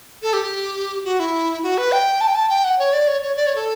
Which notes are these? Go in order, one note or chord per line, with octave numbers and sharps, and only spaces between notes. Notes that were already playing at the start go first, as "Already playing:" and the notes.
A4
G4
F#4
E4
F#4
B4
G5
A5
G5
A5
G5
F#5
C#5
D5
C#5
C#5
D5
C#5
A4